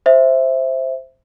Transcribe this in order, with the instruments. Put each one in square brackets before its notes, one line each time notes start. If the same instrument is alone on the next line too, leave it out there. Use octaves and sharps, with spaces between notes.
[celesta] C5 E5